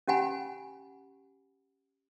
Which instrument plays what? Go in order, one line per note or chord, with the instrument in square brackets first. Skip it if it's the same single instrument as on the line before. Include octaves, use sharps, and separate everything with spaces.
[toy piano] C#4 G4 F#5 G#5 B5